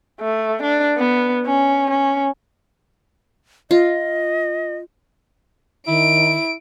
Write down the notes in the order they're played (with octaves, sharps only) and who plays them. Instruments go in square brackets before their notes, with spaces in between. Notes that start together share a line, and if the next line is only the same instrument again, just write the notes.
[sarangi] A3
D4
B3
C#4
C#4
[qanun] F4 [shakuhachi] D#5
[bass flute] D#3 [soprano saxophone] E4 [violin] D7